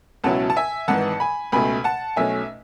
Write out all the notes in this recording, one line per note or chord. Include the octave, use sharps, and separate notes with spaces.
C#2 B2 F#3 C#4 E4 F#5 A5
A5
E5 G#5
G#1 G#2 E3 F#5 A5
G#5 B5
C#2 B2 A3 G#5 B5
F#5 A5
B1 B2 A3 C#4 E5 G#5